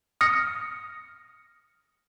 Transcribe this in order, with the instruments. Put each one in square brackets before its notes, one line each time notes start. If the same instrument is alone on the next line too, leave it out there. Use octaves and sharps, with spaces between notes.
[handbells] D#6 F6 A#6 C#7